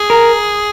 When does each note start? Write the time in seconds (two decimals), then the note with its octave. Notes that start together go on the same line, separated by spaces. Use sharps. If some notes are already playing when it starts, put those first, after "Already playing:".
Already playing: G#4
0.10 A#4